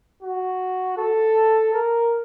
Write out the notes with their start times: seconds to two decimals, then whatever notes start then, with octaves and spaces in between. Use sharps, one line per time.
0.22 F#4
0.98 A4
1.74 A#4